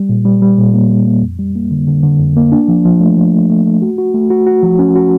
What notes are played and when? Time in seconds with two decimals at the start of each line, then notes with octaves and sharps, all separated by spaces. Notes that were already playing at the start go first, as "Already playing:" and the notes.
Already playing: G3
0.09 A#2
0.25 G3
0.42 G3
0.58 A#2
0.74 A#3
0.90 G3
1.06 A#3
1.22 F2
1.39 G3
1.55 A#3
1.71 D3
1.87 D3
2.03 D3
2.20 F2
2.37 A#3
2.52 D4
2.68 F3
2.85 F3
3.01 A3
3.17 F3
3.33 A3
3.50 A3
3.66 A3
3.82 F#4
3.98 F#4
4.14 A3
4.30 F#4
4.47 F#4
4.63 F3
4.79 C#4
4.95 F#4